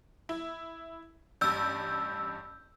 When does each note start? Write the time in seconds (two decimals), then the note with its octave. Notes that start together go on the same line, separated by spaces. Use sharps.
0.29 E4
1.41 A1 G2 E6 G6